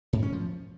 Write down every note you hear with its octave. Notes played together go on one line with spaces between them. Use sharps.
G#2
C#4
F3